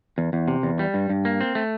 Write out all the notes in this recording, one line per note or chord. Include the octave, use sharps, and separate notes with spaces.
E2
E2
C3
E2
G3
G2
G2
A#3
C4
A3